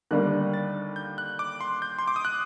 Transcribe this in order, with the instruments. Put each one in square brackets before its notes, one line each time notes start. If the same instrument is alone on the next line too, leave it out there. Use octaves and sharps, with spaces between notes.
[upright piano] D#2 D3 G3 A#3 [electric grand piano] F#6
[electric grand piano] A6
G6
F#6
D6
C6
G6
C6
D6
D#6
F#6